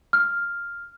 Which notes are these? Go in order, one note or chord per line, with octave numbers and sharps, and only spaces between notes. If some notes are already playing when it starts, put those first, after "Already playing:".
F6